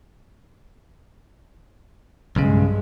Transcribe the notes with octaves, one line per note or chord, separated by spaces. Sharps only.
B1 G2 C#3 G#3